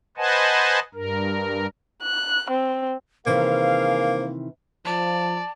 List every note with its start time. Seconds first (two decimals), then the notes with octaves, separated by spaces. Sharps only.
0.17 B4 C5 D#5 F#5 G#5 A5
0.94 G2 A#4
2.03 F#6
2.51 C4
3.26 C3 D#3 E3 A#3 G#4 C5 F5
4.85 F3 D5 A5